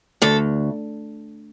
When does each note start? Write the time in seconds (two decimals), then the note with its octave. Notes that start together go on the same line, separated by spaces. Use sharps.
0.22 D2 A4